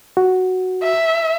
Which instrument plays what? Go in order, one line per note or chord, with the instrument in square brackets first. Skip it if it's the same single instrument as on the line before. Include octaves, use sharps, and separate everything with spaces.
[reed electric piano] F#4
[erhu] E5